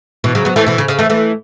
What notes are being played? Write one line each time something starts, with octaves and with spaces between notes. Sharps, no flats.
B2 E3
C#3 F#3
F#3 B3
E3 A3
B2 E3
C#3
C#3
E3 A3
E3 A3